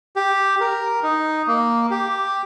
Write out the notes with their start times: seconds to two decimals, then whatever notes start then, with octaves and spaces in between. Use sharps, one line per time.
0.16 G4
0.60 A#4
1.03 D#4
1.47 A#3
1.91 G4